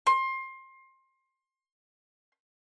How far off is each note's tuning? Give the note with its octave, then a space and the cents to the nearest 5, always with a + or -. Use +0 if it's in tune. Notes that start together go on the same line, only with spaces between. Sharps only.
C6 +25